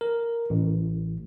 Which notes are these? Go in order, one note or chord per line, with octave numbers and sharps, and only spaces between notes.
A#4
A1